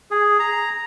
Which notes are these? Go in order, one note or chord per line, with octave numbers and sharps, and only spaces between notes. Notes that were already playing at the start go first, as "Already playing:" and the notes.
G#4
A#5